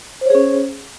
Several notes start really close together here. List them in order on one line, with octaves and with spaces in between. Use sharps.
C5 C#5 G#4 C#4